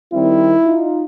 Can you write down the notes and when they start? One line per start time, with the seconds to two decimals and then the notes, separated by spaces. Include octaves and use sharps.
0.13 D#3 G3 C4 E4
0.63 D#4 F4